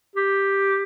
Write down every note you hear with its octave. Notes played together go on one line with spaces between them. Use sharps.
G4